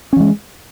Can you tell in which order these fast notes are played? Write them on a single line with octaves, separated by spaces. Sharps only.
C#4 E3 G#3